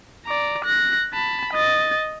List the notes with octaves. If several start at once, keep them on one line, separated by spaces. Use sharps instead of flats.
D5 A#5
F#6 A#6
A5 B5
D#5 A6